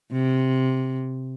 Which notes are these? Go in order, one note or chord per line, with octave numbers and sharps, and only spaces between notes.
C3